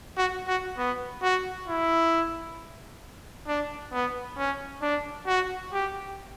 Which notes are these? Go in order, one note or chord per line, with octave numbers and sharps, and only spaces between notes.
F#4
F#4
B3
F#4
E4
D4
B3
C#4
D4
F#4
G4